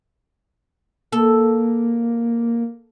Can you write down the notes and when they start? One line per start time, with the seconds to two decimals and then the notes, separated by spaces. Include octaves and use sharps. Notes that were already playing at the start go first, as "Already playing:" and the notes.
1.12 A#3 A4